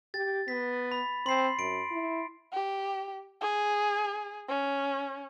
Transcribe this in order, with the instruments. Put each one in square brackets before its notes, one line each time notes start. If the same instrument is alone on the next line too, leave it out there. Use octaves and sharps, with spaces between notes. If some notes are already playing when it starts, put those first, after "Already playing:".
[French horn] G4 [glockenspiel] A6
[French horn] B3 [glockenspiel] B6
[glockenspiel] B5
[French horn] C4 [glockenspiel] C6 C7
[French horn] F#2 [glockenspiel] D7
[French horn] E4
[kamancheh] G4
G#4
C#4